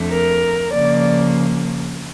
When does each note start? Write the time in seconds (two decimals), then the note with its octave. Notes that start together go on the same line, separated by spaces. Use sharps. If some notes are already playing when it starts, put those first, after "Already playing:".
Already playing: F2 D3 A3
0.09 A#4
0.72 C#3 F3 A#3 D5